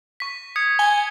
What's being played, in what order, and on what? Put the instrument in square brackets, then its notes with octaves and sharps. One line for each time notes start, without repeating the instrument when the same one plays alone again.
[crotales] C#6 B6
D#6 G#6 C#7
[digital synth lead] G#5 [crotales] G7